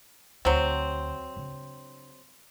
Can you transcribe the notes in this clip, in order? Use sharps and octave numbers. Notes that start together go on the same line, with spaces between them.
D2 F#3 C4
C#3 D4